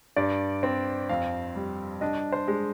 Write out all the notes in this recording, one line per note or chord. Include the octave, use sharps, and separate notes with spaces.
G2 D5
C4
F2 F5
G3
D4 D#5
C5
G#3